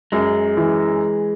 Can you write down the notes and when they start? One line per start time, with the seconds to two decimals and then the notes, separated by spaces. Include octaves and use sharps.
0.12 F#2 G#3
0.57 E3